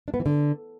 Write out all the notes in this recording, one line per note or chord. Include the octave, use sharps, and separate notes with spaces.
D4
B3
E3
D3